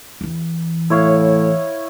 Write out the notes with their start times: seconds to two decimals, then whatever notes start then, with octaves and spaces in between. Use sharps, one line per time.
0.21 E2 E3
0.90 A2 E4 C#5 F5